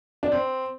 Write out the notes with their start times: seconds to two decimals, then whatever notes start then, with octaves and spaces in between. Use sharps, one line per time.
0.23 D4
0.32 C4